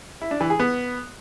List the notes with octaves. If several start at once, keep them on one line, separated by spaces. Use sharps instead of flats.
E4
D4
E3
G#4
B3